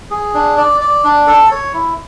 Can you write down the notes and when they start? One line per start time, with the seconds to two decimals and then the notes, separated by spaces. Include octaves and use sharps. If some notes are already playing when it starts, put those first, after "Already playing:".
0.11 G#4
0.34 D4
0.58 D5
0.81 D5
1.04 D4
1.27 A4
1.51 C#5
1.74 E4